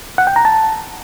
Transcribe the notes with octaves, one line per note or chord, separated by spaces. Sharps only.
F#5
G5
A#5
A5